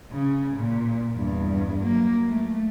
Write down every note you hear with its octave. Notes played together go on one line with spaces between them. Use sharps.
C#3
A#2
E2 G2
F#3 A#3
A3